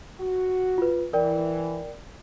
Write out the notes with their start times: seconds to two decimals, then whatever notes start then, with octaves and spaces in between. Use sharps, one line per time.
0.19 F#4
0.78 F4 B4
1.13 E3 A#4 D5 G5